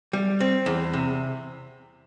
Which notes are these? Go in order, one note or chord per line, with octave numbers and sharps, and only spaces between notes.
G3
C4
E2
C3